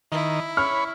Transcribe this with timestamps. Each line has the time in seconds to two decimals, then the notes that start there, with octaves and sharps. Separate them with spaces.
0.12 D#3 E4
0.57 C#5 B5 F6